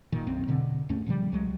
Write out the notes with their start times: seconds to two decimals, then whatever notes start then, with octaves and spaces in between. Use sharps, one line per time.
0.12 F#1 A#2 D#3
0.27 B1 F#2 C4
0.48 E1 B2 D3
0.89 D#2 G#2 A3 C#4
1.06 A#2 C#3 F3 G3
1.32 C2 F#3 G#3